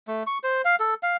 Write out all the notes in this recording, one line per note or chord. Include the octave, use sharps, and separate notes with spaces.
A3
C#6
C5
F5
A4
F5